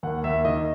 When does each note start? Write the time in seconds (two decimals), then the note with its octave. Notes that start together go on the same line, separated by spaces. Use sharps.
0.03 D#2 F#5
0.24 D#2 E5
0.45 D#3 D#5